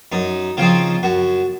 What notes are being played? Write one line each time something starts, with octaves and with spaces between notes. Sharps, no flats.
F#2 D#4
C#3 F3 C4 D#4 F4
F#2 F#4